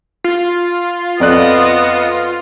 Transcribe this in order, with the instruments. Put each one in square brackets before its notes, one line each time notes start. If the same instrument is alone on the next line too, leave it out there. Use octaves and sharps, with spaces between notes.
[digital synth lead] F4
[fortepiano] F2 D5 F#6 [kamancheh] B3 D#5